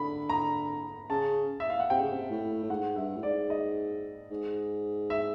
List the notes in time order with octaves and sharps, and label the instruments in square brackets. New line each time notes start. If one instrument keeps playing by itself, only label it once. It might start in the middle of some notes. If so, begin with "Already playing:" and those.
Already playing: [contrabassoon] D3 [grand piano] B5
[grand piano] A#5
[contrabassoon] C#3 [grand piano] A5
[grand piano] E5
F5
F#5
[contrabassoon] C3 [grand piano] G5
[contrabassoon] C#3
C3
A2
A2
[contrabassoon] G#2 [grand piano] F#5
[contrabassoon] G2 [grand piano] E5
[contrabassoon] A2
[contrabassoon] G#2 [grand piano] D5
[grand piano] D#5
[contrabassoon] G#2
[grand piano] E5